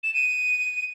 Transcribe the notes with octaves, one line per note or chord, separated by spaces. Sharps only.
E7
D#7